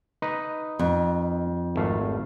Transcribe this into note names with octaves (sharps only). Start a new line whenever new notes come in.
D#4 B4
F2
G#1 A3 F5